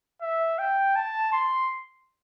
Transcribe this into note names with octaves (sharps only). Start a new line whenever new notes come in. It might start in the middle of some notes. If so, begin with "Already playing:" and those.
E5
G5
A5
C6